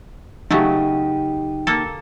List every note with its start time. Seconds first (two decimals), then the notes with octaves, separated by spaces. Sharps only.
0.51 C#3 F#3 A3 D#4 G4
1.67 A#3 A4